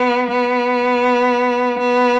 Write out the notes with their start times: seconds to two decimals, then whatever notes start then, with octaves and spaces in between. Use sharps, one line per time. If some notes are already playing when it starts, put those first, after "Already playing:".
Already playing: B3
0.31 B3
1.79 B3